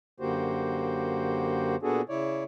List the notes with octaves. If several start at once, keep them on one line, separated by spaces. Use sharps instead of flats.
F#2 D3 A#3 F#4 G4 C5
A#2 B3 D4 F#4 G#4 A4
C#3 E4 C#5 D5